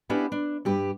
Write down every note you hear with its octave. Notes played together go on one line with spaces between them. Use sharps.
B3 C#4 D4 E4 G4
D4
G2 G4 B4